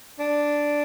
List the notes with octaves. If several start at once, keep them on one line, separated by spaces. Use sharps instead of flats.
D4